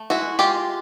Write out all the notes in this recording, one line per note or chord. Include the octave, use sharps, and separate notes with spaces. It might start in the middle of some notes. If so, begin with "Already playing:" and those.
Already playing: A3
G#3 E4 F#4
G#3 F4 G4